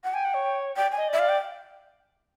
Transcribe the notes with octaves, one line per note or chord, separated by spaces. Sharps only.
F#5
G5 G#5
F#5
C#5
D5 G5
G#5
D#5
D5 E5
F5
G5